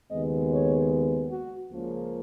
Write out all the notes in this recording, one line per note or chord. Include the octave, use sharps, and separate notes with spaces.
D#2 C#3 G#3 B3 D#5
C#5
F#4
C#2 C#3 F3 A#3